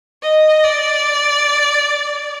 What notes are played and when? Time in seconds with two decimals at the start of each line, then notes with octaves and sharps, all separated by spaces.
0.23 D#5
0.64 D5